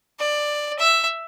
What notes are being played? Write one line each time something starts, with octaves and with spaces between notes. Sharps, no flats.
D5
E5